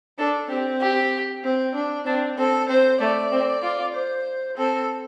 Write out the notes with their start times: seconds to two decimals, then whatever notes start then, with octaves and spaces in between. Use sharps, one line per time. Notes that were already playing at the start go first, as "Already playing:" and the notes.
0.18 D4 A4
0.50 C4 G4
0.81 G4
1.44 C4
1.75 D4
2.06 C4 D4
2.38 C4 A4
2.69 C4 C5
3.01 A3 D5
3.32 C4
3.63 F4
3.94 C5
4.57 C4 A4